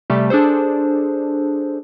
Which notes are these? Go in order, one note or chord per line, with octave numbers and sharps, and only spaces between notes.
C3 G3 A3
D4 G#4 A4 C5